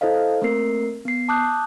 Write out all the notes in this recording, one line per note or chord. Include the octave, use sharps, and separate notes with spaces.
E4 A4 C5 D#5 F5
A3 A#3 C4 A#4 C7
B3 C7
A5 D6 D#6 F#6 G6